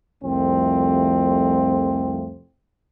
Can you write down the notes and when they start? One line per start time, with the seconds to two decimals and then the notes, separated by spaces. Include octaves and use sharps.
0.24 C2 F2 F3 A3 C4